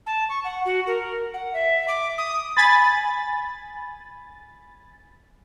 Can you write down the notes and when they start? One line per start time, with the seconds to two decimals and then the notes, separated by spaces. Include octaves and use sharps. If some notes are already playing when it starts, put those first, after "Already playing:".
0.06 A5
0.29 C#6
0.44 F#5
0.65 F#4
0.87 A#4
1.34 F#5
1.54 E5
1.88 D6
2.18 D#6
2.57 G#5 B5 A6